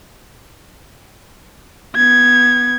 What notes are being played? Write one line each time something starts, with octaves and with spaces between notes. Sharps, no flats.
B3 G#6